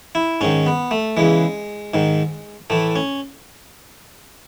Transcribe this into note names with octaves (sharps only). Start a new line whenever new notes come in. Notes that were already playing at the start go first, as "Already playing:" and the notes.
E4
G#2 D#3 C#4
B3
A3
E2 C#3 E3 G#3
G#2 D#3
A2 E3 A3
C#4